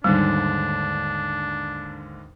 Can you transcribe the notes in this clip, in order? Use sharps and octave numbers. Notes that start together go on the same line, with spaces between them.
D#2 G#2 D3 G3 D4